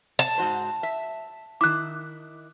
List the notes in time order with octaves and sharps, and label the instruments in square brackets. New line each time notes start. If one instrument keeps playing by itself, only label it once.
[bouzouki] A5
[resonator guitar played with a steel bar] G#2 F#4 C5
E5
[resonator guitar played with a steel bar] D#3 E4 [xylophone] D6 F#6